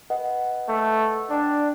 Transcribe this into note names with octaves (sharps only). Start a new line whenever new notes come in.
B4 D#5 F#5
A3
D4 D5 G5